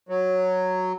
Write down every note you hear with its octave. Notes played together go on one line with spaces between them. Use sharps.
F#3